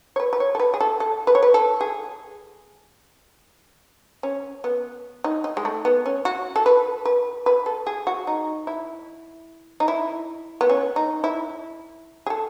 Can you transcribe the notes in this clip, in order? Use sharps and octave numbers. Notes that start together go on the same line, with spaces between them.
C#5
B4
B4
C#5
A4
B4
G#4
A4
A4
B4
C#5
B4
A4
G#4
C#4
B3
D#4
D#4
G#3
A3
B3
C#4
F#4
A4
B4
B4
B4
A4
G#4
F#4
D#4
E4
D#4
E4
B3
C#4
D#4
E4
G#4
A4